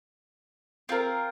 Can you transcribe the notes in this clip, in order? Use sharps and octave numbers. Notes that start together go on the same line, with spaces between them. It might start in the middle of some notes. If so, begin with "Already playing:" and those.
C4 F4 A#4